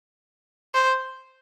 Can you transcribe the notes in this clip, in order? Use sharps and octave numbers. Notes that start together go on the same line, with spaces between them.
C5